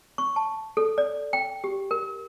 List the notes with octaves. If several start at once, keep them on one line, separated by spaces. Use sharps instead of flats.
C#6
A5
A4
D5
G5
G4
A#4